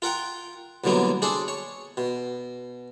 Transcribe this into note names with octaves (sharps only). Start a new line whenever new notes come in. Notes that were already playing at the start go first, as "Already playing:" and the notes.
F4 A#4 F#5 G5
C2 B2 D3 F#3 A#3 B3
D4 G#4 A4 C5 D5
C#5
B2